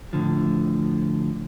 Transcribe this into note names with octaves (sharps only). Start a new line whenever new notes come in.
A2 D3 F3